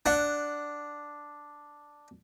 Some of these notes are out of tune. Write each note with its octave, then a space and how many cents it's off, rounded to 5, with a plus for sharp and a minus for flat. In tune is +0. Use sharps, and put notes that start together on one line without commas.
D4 +0 F#5 +0